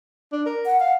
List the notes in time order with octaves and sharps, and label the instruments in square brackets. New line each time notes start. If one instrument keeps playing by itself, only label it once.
[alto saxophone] D4
A#4
[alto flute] F#5
[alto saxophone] F5 [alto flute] F#5